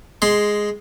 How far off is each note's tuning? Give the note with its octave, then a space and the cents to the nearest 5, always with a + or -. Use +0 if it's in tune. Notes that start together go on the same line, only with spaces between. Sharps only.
G#3 +0 C6 +0